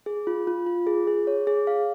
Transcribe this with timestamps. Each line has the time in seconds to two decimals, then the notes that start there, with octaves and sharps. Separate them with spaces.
0.06 G#4
0.27 F4
0.47 F4
0.66 F4
0.87 G#4
1.07 G#4
1.27 C#5
1.47 G#4
1.67 F5